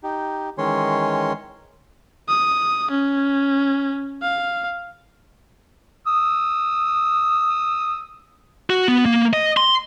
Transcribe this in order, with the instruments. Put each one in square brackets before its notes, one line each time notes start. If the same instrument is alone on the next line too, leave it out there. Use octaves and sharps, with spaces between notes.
[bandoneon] D#4 G4
D#3 E3 G#3 C#4 C#5 C6
[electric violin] D#6
C#4
F5
[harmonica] D#6 E6
[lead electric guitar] F#4
B3
A#3
D#5
C6